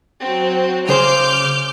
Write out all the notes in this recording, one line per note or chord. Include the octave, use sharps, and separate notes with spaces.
F#3 C4
C#3 G#4 C5 D6 F6 G6